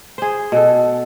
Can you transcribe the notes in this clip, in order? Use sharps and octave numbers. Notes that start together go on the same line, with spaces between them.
G#4 C5
B2 A4